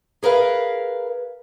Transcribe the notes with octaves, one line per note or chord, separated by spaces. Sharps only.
G#4 A#4 B4 F5